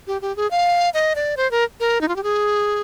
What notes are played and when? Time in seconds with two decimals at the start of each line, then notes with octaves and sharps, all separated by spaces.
0.07 G4
0.22 G4
0.36 G#4
0.51 F5
0.94 D#5
1.15 D5
1.37 C5
1.51 A#4
1.80 A#4
2.01 D#4
2.08 F4
2.16 G4
2.23 G#4